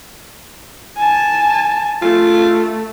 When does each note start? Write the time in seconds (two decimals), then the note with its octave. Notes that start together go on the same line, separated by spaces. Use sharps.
0.97 G#5 A5
2.02 A3 F4